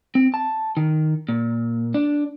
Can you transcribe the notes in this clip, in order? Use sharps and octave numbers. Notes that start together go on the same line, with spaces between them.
C4
A5
D#3
A#2
D4